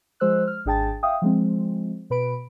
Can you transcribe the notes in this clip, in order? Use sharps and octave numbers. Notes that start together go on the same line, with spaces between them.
F3 G#3 C5 E6 F#6
F6
G#1 D4 G#4 G5 A5 A6
E5 F5 G5 D#6
F3 G#3 C4
B2 B4 B5 D7